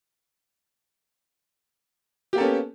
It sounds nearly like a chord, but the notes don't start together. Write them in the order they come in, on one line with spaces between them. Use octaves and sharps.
G4 A#3 A4 C#4 B3